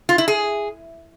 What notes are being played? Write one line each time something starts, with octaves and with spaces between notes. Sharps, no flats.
F4
E4
G#4